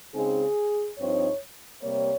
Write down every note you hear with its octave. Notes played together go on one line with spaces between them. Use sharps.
C#3 G#3 C4 D#4 G#4
G2 F3 C4 D#4 C#5
C3 G3 A#3 C#5